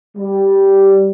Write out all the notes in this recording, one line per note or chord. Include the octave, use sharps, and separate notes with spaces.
G3